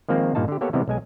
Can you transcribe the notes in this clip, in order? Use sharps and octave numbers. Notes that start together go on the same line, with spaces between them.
D#3 F3 G#3 A#3 C4 C5
G2 A#2 A#3 D#4 A5
D3 G4
A#3 B3 G4 A4 C#5
C3 E3 G3 G#3 B3 C4
B1 G#3 G#5